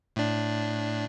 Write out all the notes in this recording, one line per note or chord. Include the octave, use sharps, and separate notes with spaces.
A2 D4